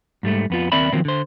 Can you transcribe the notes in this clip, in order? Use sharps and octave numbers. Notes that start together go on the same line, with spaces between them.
G#2 G3 A3
F2 B3 F4
D#2 C4 A#4 D5 E5 B5
D#3 F3 F#3 A#3 C4
D3 C5